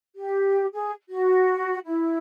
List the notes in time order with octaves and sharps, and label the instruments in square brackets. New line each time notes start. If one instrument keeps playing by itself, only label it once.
[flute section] G4
G#4
F#4
E4